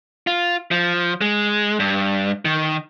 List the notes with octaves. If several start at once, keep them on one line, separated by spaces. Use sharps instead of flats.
F4
F3
G#3
G2
D#3